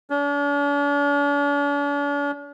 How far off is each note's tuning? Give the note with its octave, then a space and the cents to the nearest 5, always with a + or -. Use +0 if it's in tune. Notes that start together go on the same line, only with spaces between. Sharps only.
D4 -45